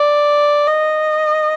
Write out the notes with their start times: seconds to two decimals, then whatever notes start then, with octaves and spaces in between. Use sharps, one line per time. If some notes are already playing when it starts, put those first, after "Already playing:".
Already playing: D5
0.67 D#5